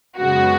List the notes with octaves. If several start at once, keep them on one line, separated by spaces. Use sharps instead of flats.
F#2 C#3 G#3 B3 F#4